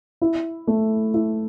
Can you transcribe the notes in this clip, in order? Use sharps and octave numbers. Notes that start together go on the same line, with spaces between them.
E4
A3
E4